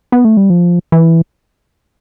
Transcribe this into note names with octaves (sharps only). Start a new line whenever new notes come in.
B3
A3
G3
F3
E3